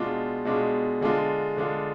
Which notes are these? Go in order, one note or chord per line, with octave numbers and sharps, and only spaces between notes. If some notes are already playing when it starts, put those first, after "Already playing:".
Already playing: B2 G#3 D4 F4
B2 G#3 D4 F4
D3 G#3 D4 F4
D3 G#3 D4 F4